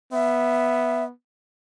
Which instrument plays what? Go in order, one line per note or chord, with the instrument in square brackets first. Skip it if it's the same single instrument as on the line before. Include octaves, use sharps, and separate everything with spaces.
[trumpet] B3 [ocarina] E5